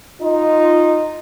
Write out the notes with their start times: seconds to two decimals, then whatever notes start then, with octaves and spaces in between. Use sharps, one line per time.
0.21 D#4 F4